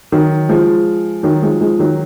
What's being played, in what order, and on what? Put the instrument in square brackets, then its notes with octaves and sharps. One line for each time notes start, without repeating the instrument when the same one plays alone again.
[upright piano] D#3 F#3
F3 G#3
D#3 F#3
F3 G#3
F3 G#3
D#3 F#3